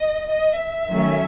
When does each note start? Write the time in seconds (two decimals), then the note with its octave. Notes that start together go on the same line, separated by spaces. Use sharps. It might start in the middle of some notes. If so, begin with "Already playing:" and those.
Already playing: D#5
0.31 D#5
0.59 E5
0.89 D#3 F#3 A3 C#4